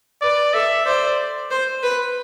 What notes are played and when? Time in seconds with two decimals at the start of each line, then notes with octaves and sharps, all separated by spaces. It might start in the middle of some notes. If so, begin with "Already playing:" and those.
0.22 B4 D5
0.54 A4 E5
0.86 C5 D5
1.51 C5
1.83 B4